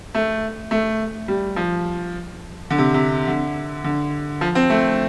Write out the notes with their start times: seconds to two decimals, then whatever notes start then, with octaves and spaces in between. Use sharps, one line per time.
0.15 A3
0.71 A3
1.28 G3
1.56 F3
2.71 D3
2.78 C3
2.94 C3
3.27 D3
3.84 D3
4.41 F3
4.55 C4
4.70 A3